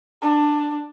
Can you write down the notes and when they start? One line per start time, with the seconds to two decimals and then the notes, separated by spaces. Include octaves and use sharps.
0.22 D4